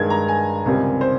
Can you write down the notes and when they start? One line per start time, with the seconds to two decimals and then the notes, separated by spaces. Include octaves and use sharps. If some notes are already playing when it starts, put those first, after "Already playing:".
Already playing: G2 D#3 G#3 G#6
0.10 A#5
0.28 G#5
0.66 C#2 C3 D#3 G3 C4
1.01 C5